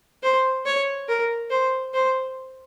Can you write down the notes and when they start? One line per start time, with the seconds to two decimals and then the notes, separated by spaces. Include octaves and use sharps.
0.23 C5
0.66 C#5
1.08 A#4
1.51 C5
1.94 C5